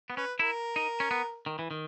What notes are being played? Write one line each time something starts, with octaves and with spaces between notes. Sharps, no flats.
B3
C#4 B4
E4 A#4
D#4
C#4
B3
D#3
E3
D#3